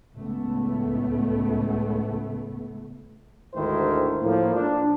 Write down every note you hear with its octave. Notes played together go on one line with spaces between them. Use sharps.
C#2 A2 A3 B3
D2 G#2 D3 D#3 E4 C5
A2 F3 A#3
D4